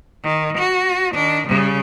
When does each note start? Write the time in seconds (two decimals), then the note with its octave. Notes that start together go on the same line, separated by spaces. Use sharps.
0.24 D#3
0.58 F#4
1.14 D#3 D4
1.47 C#3 G3